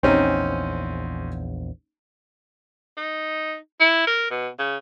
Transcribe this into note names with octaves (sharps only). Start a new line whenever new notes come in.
A#1 E2 C4 C#4 D#4
D#4
E4
A#4
B2
C#3